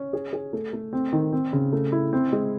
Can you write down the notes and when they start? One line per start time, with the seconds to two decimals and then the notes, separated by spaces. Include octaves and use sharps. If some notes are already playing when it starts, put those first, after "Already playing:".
Already playing: C#4
0.13 G#4
0.33 G#4
0.53 A3
0.73 A3
0.93 C4
1.13 D#3
1.33 C4
1.53 C#3
1.73 A3
1.92 E4
2.13 C4
2.33 G#3